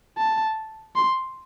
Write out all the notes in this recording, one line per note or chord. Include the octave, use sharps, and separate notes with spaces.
A5
C6